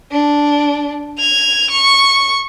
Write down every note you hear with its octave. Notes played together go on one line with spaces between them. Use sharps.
D4
G#6 F7
C#6